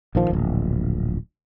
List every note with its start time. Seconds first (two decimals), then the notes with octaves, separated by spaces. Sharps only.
0.15 A#1 D#3 F3
0.30 D1 A#1